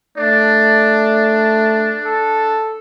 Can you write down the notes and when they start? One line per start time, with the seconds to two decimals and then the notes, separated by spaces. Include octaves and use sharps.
0.17 A3 D4 D5
2.05 A4